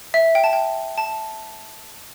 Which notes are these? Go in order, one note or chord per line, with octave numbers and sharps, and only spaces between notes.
E5
G5
A5
G5
A5